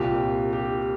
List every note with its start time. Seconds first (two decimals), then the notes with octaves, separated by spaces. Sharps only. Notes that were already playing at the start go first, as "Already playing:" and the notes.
Already playing: C2 A#2 G4
0.53 G4